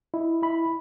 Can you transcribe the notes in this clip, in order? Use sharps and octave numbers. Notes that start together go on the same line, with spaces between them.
E4 D#5
E4 B5